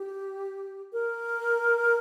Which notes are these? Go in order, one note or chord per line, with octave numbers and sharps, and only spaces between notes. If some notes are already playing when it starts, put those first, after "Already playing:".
Already playing: G4
A#4